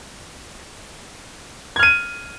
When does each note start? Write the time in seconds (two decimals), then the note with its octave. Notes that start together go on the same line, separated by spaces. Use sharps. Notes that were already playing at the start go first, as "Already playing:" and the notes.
1.76 G#6
1.79 F6
1.83 D#7